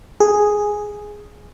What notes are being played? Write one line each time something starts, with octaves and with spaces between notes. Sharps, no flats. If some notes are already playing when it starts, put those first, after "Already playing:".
G#4